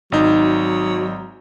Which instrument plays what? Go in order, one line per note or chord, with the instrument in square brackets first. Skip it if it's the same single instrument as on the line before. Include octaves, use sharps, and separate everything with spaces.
[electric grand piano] G#1 D#4 [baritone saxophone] F#3